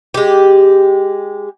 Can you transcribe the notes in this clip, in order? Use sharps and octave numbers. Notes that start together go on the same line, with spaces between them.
G#3 G4